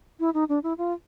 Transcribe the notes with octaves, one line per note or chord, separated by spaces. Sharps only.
E4
D#4
D4
E4
F4